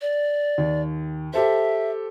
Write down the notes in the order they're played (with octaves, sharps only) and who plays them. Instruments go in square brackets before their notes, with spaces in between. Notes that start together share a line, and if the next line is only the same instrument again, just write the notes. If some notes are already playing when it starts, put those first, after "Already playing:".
[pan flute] D5
[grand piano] D#2
[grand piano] G4 A4 C5 [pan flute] E5